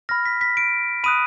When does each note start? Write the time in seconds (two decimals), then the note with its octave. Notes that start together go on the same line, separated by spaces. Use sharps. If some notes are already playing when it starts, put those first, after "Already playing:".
0.09 B5 F6 A#6
0.25 B6
0.41 B6
0.57 D7
1.04 B5 D#6 F#6 D#7